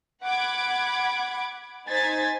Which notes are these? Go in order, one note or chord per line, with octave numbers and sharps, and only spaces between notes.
F#5 B5 D6 G#6
D#4 C5 G#5 G#6 A6 B6